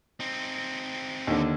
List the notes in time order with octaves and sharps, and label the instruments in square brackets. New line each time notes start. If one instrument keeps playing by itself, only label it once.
[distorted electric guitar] C4 D#4
[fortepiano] D#2 D3